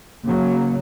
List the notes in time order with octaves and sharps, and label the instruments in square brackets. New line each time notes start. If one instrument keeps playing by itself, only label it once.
[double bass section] C#3 F#3 [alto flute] A#3